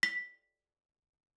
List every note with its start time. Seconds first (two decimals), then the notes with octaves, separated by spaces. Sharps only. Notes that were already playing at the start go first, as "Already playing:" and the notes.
0.03 B6